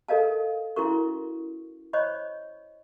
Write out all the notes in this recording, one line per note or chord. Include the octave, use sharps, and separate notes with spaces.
A4 A#4 D#5 F5 A5
C#4 E4 F#4 A#4 C#6
C5 C#5 D#5 B5 C#6